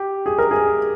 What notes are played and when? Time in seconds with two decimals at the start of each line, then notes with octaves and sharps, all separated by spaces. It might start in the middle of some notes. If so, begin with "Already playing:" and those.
Already playing: G4
0.26 G#4
0.38 A#4
0.51 G#4